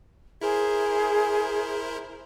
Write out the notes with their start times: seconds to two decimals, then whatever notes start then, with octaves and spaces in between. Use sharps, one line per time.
0.41 E4 G#4 A#4 C5